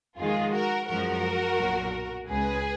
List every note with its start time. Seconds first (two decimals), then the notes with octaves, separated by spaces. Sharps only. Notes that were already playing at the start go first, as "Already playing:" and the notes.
0.19 F2 D#3 G#3 F4 G#4
0.54 F#4 A#4
0.89 F#2 F3 G#3 F#4 A#4
1.59 B1 A#2 F#3
2.28 C#2 C#3 G#3 G#4 B4